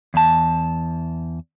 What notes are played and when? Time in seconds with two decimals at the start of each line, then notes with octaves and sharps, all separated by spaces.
0.14 E2 A5